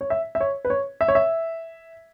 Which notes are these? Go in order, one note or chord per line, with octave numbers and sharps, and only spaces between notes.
C#5
E5
E5
C#5
B4
C#5
E5
C#5
E5